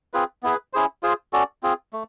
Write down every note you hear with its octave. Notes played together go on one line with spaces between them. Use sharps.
C4 F4 G#4 B4
B3 E4 G#4 B4
C#4 E4 G#4 C5
F4 G#4 C5
C#4 F#4 A4 D5
C4 F4 G#4
A3